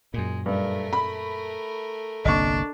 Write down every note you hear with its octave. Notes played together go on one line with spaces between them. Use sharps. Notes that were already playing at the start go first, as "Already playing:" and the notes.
F#2 A#2 G#3
G2 A3 A#4
B5
G1 C2 A#3 D4 D#5 C#6